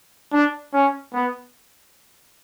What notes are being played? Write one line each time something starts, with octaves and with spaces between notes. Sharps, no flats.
D4
C#4
B3